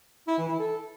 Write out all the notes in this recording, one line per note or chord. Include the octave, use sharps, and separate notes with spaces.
E4
E3
E4
A4